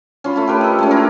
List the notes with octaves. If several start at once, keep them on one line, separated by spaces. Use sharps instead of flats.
C#4 F4 B5
A3 F4
G4 A#4 B4
A4 D#5
G#3 A3 C#4
D4 E4 G4 A#4